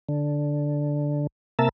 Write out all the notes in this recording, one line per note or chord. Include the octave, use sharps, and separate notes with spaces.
D3
C3 A#3 A#4 E5 A5